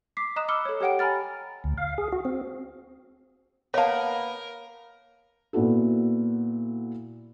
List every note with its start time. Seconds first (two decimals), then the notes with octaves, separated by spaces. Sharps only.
0.17 D6 B6 C7
0.36 D#5 A#5 D#6 F#6 E7
0.48 B5 D6 E6 F6 C#7 G7
0.65 A4 C#5
0.81 G4 C#5 F#5 G5 D7
0.99 G#5 A#5 B5 F6 A6
1.64 D2
1.78 F5
1.98 G#4
2.12 F#4
2.25 C4
3.74 A#3 B3 A#4 C#5 D#5 F5 A5
5.53 A#2 B3 E4 F#4 A4